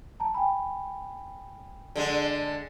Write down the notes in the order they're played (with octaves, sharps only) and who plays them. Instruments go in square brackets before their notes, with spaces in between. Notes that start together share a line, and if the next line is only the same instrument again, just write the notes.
[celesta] A5 A#5
G5 G#5 B5
[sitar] D3 G#3